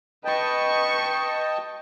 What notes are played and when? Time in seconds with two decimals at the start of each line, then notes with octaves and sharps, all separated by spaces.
0.25 B4 D#5 G5 A5 C#6